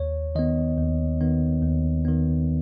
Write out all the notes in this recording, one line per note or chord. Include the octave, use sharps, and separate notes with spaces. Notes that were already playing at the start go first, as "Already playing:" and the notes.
Already playing: D#2 C#5
D#3 B3 D#5
D#2
D#3 B3
D#2
D#3 B3